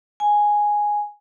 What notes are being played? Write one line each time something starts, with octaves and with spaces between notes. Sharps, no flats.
G#5